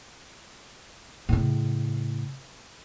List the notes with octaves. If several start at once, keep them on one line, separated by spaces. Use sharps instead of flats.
A2 C#3